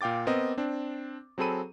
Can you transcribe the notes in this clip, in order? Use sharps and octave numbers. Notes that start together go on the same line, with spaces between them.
A#2 F5 G5 D6 A6
B3 C4 A#4 D#5
C4 D4
F#3 C4 G#4 A4 B5 D#7